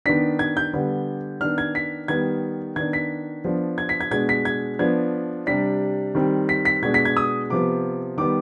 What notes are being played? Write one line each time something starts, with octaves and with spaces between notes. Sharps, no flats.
D#3 B3 D4 B6
G#6
G6
D3 G3 B3 D4
D#3 B3 D4 F6
G#6
B6
D#3 G3 B3 G#6
D#3 B3 D4 G#6
B6
F3 B3 D4
G#6
B6
G#6
B2 G#3 D4 G#6
B6
G#6
F3 B3 D4 G#6
C3 G3 D4 B6
D#3 G3 C4
B6
B6
B2 G#3 D4 G#6
B6
G#6
D#6
C3 F3 B3 D6
D#3 G3 B3 D6